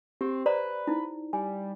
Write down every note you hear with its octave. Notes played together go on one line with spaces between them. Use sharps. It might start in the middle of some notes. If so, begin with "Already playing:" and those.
C4 G4
B4 C5 D5 A#5
D#4 E4
G3 G#5